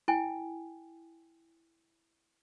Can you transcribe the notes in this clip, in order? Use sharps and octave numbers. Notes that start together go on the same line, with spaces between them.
E4 G5 G#5